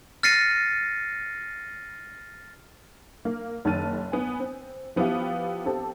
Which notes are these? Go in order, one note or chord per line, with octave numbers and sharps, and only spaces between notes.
F6 A6 A#6 C7 C#7 D#7
A#3
F#1 D#3 A5 F6 A6 D#7
B3 G#5
C4
F3 B3 E4 F4 G4
C4 G4 A4